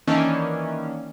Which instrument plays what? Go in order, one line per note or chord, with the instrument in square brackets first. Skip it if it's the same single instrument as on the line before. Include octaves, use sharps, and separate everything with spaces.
[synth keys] D#3 E3 A#3 C#4 D4